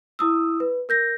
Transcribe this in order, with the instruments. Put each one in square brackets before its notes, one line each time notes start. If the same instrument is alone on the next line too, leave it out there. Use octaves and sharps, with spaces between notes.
[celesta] E4 D#6 E6
B4
A#4 G6 A#6